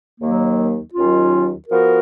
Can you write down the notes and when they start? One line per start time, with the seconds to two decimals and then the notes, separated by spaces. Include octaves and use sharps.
0.20 D#2 D#3 F#3 A#3
0.94 D#2 D#3 F#3 C#4 F4
1.68 F3 B3 F#4 A#4